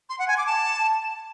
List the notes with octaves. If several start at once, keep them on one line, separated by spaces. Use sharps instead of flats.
C6
F#5
G#5
D6
A5